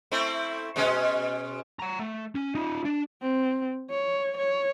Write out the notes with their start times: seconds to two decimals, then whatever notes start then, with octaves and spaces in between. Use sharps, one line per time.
0.12 A3 C4 E4
0.76 B2 G#3 C#4
1.80 F#5 A#5
1.99 A3
2.35 C#4
2.55 D#4 F4
2.85 D4
3.22 C4
3.90 C#5
4.37 C#5